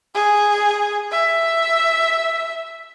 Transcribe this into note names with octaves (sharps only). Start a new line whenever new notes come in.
G#4
E5